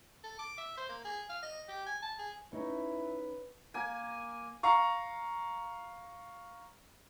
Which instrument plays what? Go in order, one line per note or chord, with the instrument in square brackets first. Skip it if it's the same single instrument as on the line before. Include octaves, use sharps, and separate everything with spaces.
[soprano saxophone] A4
D6
E5
C5
A#3
G#4
F5
D#5
G4
G#5
A5
G#4
[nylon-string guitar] C#4 D#4 [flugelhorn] E4 [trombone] B4
[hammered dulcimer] A#3 G#5
[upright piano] F5 A#5 C#6